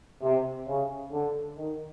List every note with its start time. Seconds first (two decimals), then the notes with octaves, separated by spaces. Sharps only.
0.23 C3
0.67 C#3
1.12 D3
1.57 D#3